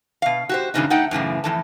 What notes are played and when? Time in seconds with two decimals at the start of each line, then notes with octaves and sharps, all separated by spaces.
0.22 B2 F5
0.49 F#4 G4 C5
0.74 E2 G2 A#2 C#3 D4 D#4
0.90 A3 D#4 A4 F#5 G5
1.11 F#2 A2 C#3 E3
1.44 F2 A2 E3 A4 A5